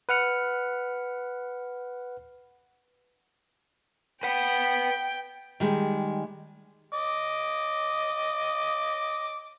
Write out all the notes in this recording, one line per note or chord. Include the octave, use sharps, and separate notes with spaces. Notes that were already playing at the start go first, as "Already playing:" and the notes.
B4 F#5 F6 C#7
B4 F#5 G5
D#3 G3 G#3
D#5 D6 D#6